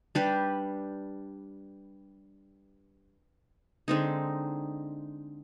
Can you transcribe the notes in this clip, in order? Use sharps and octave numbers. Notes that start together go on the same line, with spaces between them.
G3 D4 G4 B4
D3 G#3 C4 D#4